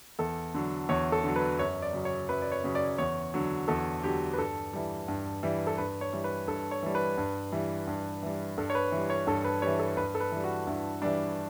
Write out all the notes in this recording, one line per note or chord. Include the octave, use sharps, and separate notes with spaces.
E2 A4
D3 F#3
E2 C#5
A4
D3 F#3
B4
F#2 C#5
D5
C#3 F#3
C#5
F#2 B4
D5
C#5
C#3 F#3
D5
E2 C#5
D3 F#3
E2 A4
D3 F#3 G4
B4
G2 A4
E3 G3
G2
E3 G3
A4
G2 B4
C#5
E3 G3
B4
G2 A4
C#5
E3 G3
B4
G2
E3 G3
G2
E3 G3
G2 A4
C#5
B4
E3 G3
C#5
G2 A4
B4
E3 G3 C#5
A4
G2 B4
A4
B4
E3 G3
F#4
G2 E4
E3 G3 D4